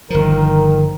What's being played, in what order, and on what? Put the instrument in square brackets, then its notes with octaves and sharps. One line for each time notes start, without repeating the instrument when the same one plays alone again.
[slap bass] G1 F3 [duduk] D#3 [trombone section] A#4